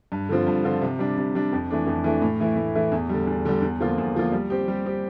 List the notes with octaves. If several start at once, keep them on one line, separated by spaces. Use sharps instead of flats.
G2
D3 F3 C4 F4
G2
D3 F3 C4 F4
C3
G3 D4
C3
G3 D4
F2
E3 A3 D4
F2
E3 A3 D4
A2
E3 A3 E4
A2
E3 A3 E4
E2
D3 G3
E2
D3 G3
E2
D3 F3 A#3 F4
E2
D3 F3 A#3 F4
G3
C4 G4
G3
C4 G4